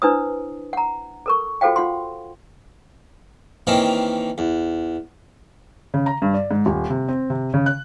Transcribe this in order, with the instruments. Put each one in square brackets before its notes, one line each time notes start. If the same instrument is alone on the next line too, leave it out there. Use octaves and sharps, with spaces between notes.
[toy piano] D4 E4 B4 C5 D#6
F#5 A#5
A4 A#4 C#6
F4 F#4 A4 C5 F5 G5
F4 F#5 C6
[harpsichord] D#3 E3 A#3 C4 C#4 D#4
E2
[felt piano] C#3
A#5
G2
D5
G#2
D#1
C3
C4
C3
C#3
F#6